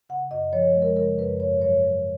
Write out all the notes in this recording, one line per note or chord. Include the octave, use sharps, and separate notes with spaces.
C#3 F#5
F#2 D#5
F3 C#5
G#3
A#4
C#3 A#4
F#2 B4
G#2 C#5
F#3 C#5
F#3